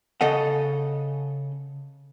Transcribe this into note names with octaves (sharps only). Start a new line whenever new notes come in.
C#3 A4 D#5 F#5